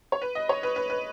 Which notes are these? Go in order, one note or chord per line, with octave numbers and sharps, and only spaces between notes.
C#5
B4
D#5
C#5
B4
B4
B4